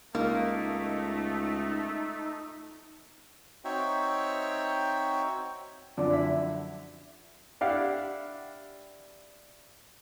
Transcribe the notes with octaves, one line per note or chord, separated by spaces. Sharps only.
C#2 A3 A#3 D#4
C4 D#4 F#4 C#5 E5 G5
F#2 D3 F3 D5
E4 E5
D4 E4 G4 F5 F#5